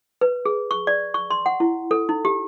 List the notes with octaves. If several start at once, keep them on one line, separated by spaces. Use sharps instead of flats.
B4
G#4
C#6
D5
C#6
C6
F#5
E4
A4
D#4
G4